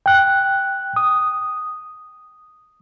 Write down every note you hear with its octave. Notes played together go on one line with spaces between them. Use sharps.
G5 F#6
D#6